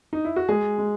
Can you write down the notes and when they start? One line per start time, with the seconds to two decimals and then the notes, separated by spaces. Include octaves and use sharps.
0.13 D#4
0.25 E4
0.36 F#4
0.49 G#3 G#4
0.79 G#3